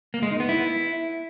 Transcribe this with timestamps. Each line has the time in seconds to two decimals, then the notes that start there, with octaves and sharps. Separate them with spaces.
0.14 A#3
0.23 G#3
0.31 D#4
0.40 B3
0.49 E4